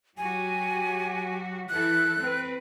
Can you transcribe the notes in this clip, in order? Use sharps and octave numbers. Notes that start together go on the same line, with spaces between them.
F#3 F#4 G4 G#5
E3 E4 A4 F#6
C4 B4